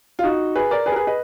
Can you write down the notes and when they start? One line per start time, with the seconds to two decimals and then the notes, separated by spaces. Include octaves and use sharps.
0.19 F4
0.24 D#4 F#4
0.56 G#4 B4
0.71 A#4 D5
0.86 G#4 B4
0.92 A#4
0.96 G#4 B4
1.07 B4 D#5